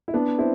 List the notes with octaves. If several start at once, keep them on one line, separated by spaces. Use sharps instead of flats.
E4
B3 D4
C4 E4